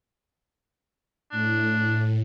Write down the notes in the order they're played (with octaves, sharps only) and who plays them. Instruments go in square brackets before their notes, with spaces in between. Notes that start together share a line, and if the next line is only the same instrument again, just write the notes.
[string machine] A2 [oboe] D4